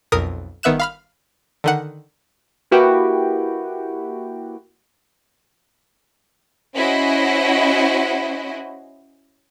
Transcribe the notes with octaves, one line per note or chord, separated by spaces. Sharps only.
B1 F2 A#4 D#6
G1 D#3 B3 E5 F#6 E7
F5 B5 F6
D3 D#3 F#5
A#3 E4 F#4 G4 B4 G5
C#4 E4 F#4 C5 D#5